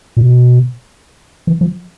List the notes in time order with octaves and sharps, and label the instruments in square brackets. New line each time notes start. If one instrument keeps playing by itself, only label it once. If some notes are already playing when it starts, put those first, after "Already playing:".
[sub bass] A#2
B2
E3
F3